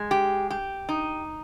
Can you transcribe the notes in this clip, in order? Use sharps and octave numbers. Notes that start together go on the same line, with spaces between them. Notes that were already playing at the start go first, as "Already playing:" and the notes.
Already playing: G#3
G4
G4
D#4